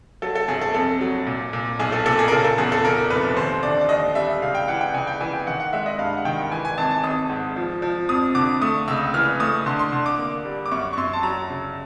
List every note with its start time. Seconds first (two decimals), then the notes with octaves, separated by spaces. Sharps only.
0.22 F#3 A4
0.35 A4
0.48 G1 G#4
0.61 A4
0.74 F2 A4
1.01 F#3
1.27 A#2
1.53 A#2
1.79 B1 G#4
1.92 A4
2.06 A#2 A4
2.19 G#4
2.28 A#4
2.31 C#3 A4
2.45 A4
2.58 E2 G#4
2.72 A4
2.84 C#3 A#4
3.10 F1 B4
3.36 D#2 C5
3.63 D3 D5
3.81 D5
3.89 D#2 D#5
4.15 G3 E5
4.42 C#2 F5
4.55 G5
4.68 E3 F#5
4.81 G5
4.94 C#2 G#5
5.07 G5
5.20 E3 G#5
5.33 G5
5.47 D#3 F#5
5.60 F#5
5.73 G#3 E5
5.86 D#5
5.99 G2 F5
6.17 F#5
6.25 D#3 G5
6.52 E3 G#5
6.65 G#5
6.78 G#1 A5
6.91 A5
7.04 G#1 D#6
7.30 G#2
7.56 F3
7.82 F3
8.09 F2 D#6
8.35 D3 D6
8.61 A3 D#6
8.88 C#2 E6
9.14 E3 F6
9.40 A3 D#6
9.66 D3 C6
9.79 C6
9.92 D3
10.06 D6
10.18 A#3
10.45 G3
10.66 D6
10.71 F#2 C#6
10.93 C#6
10.97 F#2 C6
11.13 A5
11.23 F#3 A#5
11.50 C#3